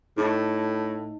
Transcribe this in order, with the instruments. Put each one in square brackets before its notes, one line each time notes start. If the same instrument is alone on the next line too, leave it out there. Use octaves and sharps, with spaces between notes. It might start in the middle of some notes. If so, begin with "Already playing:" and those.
[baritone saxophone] A2 [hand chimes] D#4